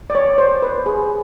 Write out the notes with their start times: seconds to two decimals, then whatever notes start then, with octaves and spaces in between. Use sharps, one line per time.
0.10 D5
0.15 C#5
0.38 C5
0.62 B4
0.86 G#4